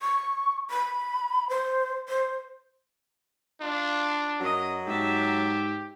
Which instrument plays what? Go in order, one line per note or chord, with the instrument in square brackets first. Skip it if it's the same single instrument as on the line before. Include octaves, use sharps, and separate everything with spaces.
[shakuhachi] C#6
B5
C5
C5
[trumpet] D4 [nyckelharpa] F4 F5
[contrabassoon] F#2 [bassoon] F#3 [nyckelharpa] A#4 D#5
[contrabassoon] G#2 [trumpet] G4 [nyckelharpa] E5 A5